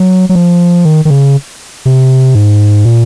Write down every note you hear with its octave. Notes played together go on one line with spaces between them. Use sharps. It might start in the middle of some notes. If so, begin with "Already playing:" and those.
Already playing: F#3
F#3
F3
D#3
D#3
C#3
C3
G#2
A#2